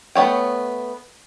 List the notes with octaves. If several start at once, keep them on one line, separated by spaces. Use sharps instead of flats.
A3 B3 C#5 G5